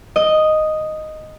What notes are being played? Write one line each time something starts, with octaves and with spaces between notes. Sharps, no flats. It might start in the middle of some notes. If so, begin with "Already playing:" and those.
D#5